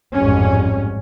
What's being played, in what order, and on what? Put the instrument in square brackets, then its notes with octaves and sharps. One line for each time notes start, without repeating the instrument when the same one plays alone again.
[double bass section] A1 F2 G#2 G3 C#4